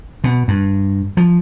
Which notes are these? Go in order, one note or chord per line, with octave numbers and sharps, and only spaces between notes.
B2
G2
F3